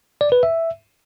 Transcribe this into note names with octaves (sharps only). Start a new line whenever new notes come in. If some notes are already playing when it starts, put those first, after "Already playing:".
D5
B4
E5